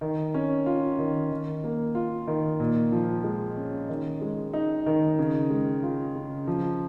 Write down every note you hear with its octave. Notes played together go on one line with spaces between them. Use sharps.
D#3
C#4
F4
D#3
D#3
A#3
F4
D#3
A#2
F3
G#3
C#4
D#3
G#3
D#4
D#3
C#3
G#3
F4
C#3
F3